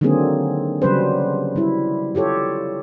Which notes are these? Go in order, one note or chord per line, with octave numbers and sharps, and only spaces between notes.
D3 D#3 F#3 A#3 C4 G#4
C#3 F#3 G3 C#4 B4 C5
G3 E4
F4 G4 A4 C#5